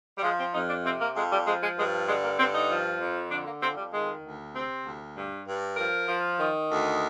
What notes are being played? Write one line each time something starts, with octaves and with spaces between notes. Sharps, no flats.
G3
F3 G#3
C4
F2 D#4
D4
C3 C4
A#3
F2 G#3
G3
F3 G#3
G#3
G2 G#3
D3 G#3
A#3
G2 C4
D#4
F3
F2
D3 D4
A#3
F2 C4
G3
D#3 G#3
D2
C3 C4
D2
G2
G2
F3 A#4
F3
D#3
D2